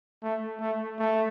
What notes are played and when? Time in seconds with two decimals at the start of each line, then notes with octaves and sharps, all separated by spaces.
0.23 A3
0.61 A3
0.99 A3